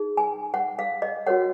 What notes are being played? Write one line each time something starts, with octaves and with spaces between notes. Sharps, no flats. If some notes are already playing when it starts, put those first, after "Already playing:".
Already playing: D#4 G#4
G#5
F#5
F5
D#5
F#4 A#4 C#5 F#5